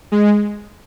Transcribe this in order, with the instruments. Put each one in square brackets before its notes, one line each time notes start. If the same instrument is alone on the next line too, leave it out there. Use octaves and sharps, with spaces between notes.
[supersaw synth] G#3